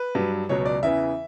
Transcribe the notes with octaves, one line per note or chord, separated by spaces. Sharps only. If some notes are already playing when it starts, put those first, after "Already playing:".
Already playing: B4
G2 F#3
C#2 B2 F#3 C#5
D5
E2 C#3 E3 E5